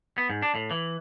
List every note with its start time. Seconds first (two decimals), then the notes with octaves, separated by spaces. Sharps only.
0.18 B3
0.30 G#2
0.42 D4
0.55 A2
0.71 E3